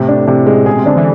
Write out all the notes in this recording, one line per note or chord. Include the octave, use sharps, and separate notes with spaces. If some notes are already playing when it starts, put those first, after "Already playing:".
Already playing: A2 C3
D4
C3
G#3
B2 G#4
C3
D3 D4
E3